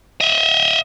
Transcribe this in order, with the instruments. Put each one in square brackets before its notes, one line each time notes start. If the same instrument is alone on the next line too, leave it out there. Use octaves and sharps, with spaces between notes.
[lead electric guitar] D#5 E5